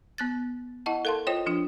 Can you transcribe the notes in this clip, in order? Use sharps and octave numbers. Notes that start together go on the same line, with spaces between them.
B3 F#6 A6
E4 D#5 F#5 A5
A4 A#4 F5 A5 C6
F4 C5 C#5 D#5 G5
F3 D4 F4